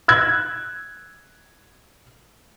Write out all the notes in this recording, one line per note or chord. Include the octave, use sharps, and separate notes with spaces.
E6 F#6 G#6